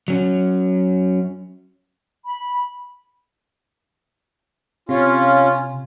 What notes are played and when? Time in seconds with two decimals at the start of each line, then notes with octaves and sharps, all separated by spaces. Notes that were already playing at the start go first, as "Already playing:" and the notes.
0.08 F#3 C#4
2.25 B5
4.89 C3 C#4 F4